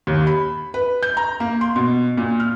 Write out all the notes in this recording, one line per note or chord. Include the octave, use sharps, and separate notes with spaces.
D#2
B5
B4
G6
A#5
A#3
C6
B2
A#2
F6